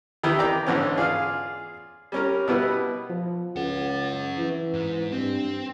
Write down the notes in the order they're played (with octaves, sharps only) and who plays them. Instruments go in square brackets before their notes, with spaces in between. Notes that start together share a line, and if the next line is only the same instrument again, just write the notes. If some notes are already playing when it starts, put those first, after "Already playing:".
[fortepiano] D#3 E3 E4 G4
D5 G5 A#5 D6
G#2 D3 E3 B3 C#4
F4 G#4 D5 F5
G3 C#4 A#4
B2 G3 B3 E4 B4
[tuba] F3
[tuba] C#2 [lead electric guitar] C#4 F#5
[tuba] E3
[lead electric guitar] G#2
[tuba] G2 [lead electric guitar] C4